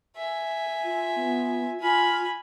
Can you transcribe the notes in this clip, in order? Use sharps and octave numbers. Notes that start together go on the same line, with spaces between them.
E5 G#5
F4
B3
F4 G#5 B5 F6